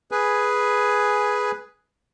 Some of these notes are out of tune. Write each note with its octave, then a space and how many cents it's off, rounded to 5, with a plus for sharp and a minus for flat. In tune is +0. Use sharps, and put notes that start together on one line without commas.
G#4 +5 B4 +0 G#5 +0